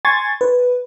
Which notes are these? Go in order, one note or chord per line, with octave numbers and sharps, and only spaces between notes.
G#5 C6 C#6 G#6 A6
B4